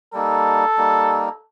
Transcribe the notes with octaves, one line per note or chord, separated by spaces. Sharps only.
G3 A#3 D#4 A4
G3 A#3 D#4